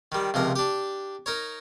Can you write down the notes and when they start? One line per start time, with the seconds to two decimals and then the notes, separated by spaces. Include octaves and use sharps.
0.12 D#3 G3
0.34 C#2 C3 F3 A#4
0.56 D4 G4
1.26 D#4 A#4 C#5